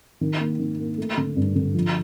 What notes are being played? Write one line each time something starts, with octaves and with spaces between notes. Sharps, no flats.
D#3
A#3
D#3
A#3
A3
D3
G2
D3
F3